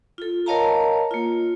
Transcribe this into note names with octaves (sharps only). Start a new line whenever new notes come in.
F4 A4
A#4 C#5 D#5 F5 A5 A#5
A#3 F4